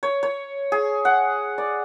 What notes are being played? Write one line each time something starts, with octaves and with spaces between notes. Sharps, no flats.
C#5
C#5
G#4
F#5
D5